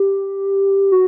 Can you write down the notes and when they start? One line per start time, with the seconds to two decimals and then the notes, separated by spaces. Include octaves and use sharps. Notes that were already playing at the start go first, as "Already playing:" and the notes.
Already playing: G4
0.92 F#4